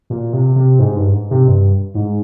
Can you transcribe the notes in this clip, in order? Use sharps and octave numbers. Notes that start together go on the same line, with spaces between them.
A#2
C3
C3
G#2
G2
G#2
C3
G2
G#2